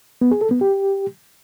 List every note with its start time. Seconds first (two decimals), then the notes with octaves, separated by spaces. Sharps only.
0.21 B3
0.31 G#4
0.41 A4
0.51 B3
0.61 G4